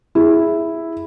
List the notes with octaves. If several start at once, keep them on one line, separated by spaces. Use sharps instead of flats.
E4 G#4